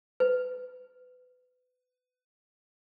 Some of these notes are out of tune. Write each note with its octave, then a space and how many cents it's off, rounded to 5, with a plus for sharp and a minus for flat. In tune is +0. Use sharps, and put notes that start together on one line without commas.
B4 +25